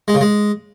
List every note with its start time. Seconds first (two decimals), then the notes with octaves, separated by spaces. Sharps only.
0.08 G#3
0.14 C#3
0.21 G#3